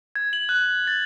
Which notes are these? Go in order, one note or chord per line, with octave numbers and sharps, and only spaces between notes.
G#6
F#7
F#6
A6